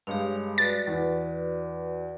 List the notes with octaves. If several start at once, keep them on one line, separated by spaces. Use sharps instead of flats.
G2 G#3 G4 C#5 F5
F#4 B4 D5 A6
E2